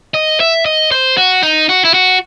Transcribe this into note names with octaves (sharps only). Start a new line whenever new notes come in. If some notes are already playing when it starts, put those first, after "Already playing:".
D#5
E5
D#5
C5
F#4
D#4
F#4
E4
F#4